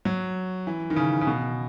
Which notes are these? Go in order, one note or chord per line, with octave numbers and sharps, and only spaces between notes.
F#3
E3
D#3
C#3
C#3
B2